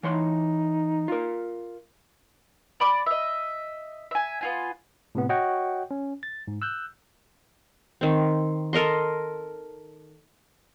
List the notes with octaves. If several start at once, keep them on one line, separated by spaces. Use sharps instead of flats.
E3 D#4 C#5 C6
F4 A#4
D5 B5 D6
D#5 E5
E5 G#5
B3 F4 G#5
A2 C3 B3
F#4 C#5 D#5 F#5 G5 C#6
C#4
A6
G#2
E6 F#6 G6
D#3 C4
A4 A#4 D#5 C6